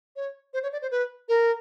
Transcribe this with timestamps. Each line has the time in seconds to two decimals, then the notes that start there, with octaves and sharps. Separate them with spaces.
0.16 C#5
0.54 C5
0.63 C#5
0.72 D5
0.82 C5
0.91 B4
1.29 A#4